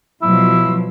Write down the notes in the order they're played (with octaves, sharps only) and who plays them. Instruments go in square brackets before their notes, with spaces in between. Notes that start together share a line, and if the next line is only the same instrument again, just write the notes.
[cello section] B2 F3 F#3 [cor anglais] E4